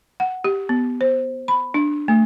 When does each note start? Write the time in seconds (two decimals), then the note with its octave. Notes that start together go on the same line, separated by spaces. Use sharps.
0.20 F#5
0.44 G4
0.69 B3
1.01 C5
1.48 B5
1.74 D4
2.08 A3